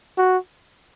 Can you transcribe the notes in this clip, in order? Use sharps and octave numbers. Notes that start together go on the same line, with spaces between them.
F#4